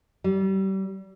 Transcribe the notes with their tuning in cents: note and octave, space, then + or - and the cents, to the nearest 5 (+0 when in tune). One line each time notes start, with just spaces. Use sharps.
G3 -30